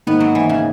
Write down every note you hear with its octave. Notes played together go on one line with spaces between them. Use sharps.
G#1 G#2 D#3 A#3 B3 D#4
F#3
E3
C#3